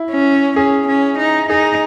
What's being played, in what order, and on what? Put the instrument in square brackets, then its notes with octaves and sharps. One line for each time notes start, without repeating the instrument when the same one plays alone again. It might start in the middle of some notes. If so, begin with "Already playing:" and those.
Already playing: [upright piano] E4
[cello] C#4
[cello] C#4 [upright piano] G#4
[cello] C#4
D#4
[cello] D#4 [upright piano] G#4